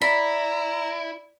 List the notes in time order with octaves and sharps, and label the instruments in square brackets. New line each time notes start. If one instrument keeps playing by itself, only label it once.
[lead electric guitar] E4 [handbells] D5 [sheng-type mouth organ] A#5 [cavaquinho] B5